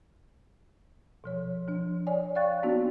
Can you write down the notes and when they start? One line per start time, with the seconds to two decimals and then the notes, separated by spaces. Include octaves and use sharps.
1.24 B2 F3 C#5
1.68 F3 D4
2.07 C#5 D5 G#5
2.35 D5 F5 G5 C#6 F#6 A6
2.63 A#3 B3 D4 D#4 F#4